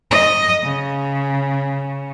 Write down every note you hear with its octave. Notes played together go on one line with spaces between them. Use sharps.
D#5
C#3